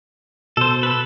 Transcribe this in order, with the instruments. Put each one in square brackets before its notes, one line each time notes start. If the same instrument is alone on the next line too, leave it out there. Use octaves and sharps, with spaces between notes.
[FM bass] B2 [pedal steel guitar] A4 C5
[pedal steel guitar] A4 B4